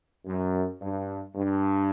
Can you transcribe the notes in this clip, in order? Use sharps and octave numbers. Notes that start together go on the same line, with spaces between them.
F#2
G2
G2